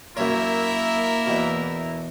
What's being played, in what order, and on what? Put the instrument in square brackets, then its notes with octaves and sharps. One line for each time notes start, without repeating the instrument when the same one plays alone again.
[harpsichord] F#2 C#5 [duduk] A#3 [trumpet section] E4 A#4 E5
[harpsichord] E2 B2